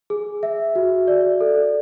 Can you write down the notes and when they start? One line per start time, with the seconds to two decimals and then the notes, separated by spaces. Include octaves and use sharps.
0.10 G#4
0.43 E5
0.75 F#4
1.08 D5
1.40 A4